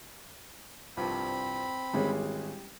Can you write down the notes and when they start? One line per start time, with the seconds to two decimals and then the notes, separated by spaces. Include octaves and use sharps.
0.97 C2 G2 F3 C4 B5
1.93 G#1 E3 G3 G#3 C#4 C#5